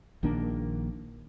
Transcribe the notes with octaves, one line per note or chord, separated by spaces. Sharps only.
A#1 D#3 A#3 D4